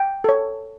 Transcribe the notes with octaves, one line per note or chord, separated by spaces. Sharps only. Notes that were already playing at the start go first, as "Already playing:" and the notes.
Already playing: G5
A4 C#5